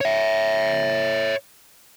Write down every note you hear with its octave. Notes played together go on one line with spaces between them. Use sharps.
C#5 E5